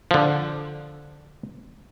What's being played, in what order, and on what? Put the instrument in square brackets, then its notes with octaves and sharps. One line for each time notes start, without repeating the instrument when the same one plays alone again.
[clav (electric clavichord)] D3 F3